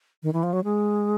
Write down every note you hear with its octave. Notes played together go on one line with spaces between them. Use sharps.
D#3
E3
F3
F#3
G#3